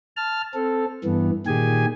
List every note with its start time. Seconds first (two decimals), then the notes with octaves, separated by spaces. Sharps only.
0.17 A5 F6
0.54 C4 A4
1.04 G2 E3 B3
1.47 A#2 D#3 G4 G#4 G#5